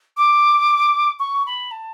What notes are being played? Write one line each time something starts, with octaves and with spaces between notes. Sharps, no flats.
D6
C#6
B5
A5